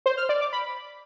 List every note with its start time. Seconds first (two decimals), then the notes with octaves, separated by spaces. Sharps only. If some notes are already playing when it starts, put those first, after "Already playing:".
0.06 C5
0.17 F6
0.29 D5
0.41 D6
0.53 B5